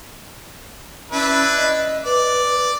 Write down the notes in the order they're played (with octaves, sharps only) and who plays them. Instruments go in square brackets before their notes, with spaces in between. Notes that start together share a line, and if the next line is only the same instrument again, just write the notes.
[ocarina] C#4 [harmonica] D4 E4 B4
[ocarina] D#5
[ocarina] B4 [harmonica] D5